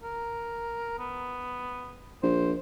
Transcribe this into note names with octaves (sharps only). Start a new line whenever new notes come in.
A#4
B3
A#1 C5